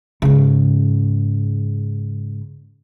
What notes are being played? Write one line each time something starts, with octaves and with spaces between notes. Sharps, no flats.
G#2 C#3